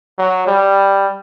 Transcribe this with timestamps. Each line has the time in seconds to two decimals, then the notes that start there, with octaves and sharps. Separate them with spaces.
0.18 F#3
0.47 G3